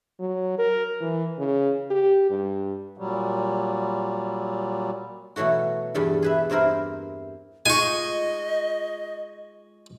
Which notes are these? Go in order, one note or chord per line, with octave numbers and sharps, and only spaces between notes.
F#3
A#4
E3
C#3
G4
G2
A#2 F#3 G3
B2 E3 F#3 A3 F#4
E2 G2 G3 G4 A4
G#4 B4 E5
G2 C4 E4 A#4 C5
G#3 D#4 F4 D#5 G#5 C#6